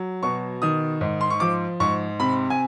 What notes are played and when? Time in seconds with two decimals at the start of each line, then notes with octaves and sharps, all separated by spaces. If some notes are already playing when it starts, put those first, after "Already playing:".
Already playing: F#3
0.23 B2 C#6
0.62 D#3 D#6
1.01 G#2
1.21 C6
1.30 C#6
1.40 F3 D6
1.80 G#2 C#6
2.20 C3 B5
2.50 G#5